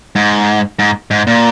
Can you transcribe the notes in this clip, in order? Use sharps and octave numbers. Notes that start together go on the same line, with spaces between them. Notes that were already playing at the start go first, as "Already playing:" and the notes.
G#2
G#2
G#2
A#2